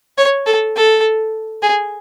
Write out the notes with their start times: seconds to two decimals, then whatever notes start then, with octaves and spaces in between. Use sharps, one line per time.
0.18 C#5
0.46 A4
0.76 A4
1.62 G#4